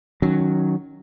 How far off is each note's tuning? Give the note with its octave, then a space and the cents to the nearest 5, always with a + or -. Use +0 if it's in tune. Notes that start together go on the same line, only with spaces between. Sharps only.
D#3 +0 F#3 +0 C#4 +20